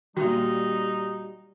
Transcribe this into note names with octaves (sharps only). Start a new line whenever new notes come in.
A#2 D#3 G3 D#4 F#4